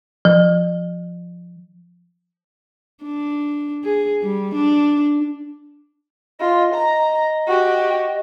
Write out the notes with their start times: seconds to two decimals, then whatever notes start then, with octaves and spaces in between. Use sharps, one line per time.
0.25 F3
3.04 D4
3.84 G#4
4.22 G3
4.54 D4
6.40 F4 D#5
6.74 A#5
7.47 F#4 G4